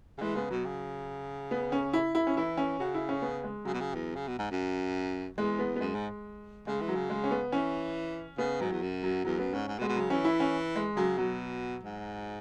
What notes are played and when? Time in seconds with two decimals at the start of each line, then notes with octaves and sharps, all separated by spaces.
0.18 C#3
0.21 E3 G#3
0.35 C#3 B3
0.50 B2 F#3
0.65 C#3
1.51 B3
1.72 C#4
1.93 E4
2.15 E4
2.27 C#4
2.36 E3 E4
2.57 C#4
2.79 C#3 F#4
2.94 E4
3.09 C#4
3.22 B3
3.44 G#3
3.65 C#3 F#3
3.73 B2
3.81 C#3
3.94 E2
4.15 C#3
4.28 B2
4.39 G#2
4.51 F#2
5.38 E2 G#3
5.59 B3
5.76 B3
5.80 F#2 G#3
5.95 G#2
6.67 C#3 G#3
6.81 E3
6.88 F#3
6.95 C#3
7.10 G#3
7.24 C#4
7.31 B3
7.52 E3 C#4
8.38 C#3 B3
8.60 G#2 F#3
8.71 E2
8.82 F#2
9.03 F#3
9.25 E2 F#3
9.39 F#2 B3
9.53 G#2 C#4
9.68 G#2
9.79 B2
9.82 G#3
9.89 B2
9.96 C#3 F#3
10.10 E3 C#4
10.25 E4
10.40 C#4
10.76 G#3
10.96 C#3 F#3
11.18 B2 F#3
11.83 G#2